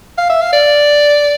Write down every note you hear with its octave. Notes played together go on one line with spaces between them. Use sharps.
F5
E5
F5
D5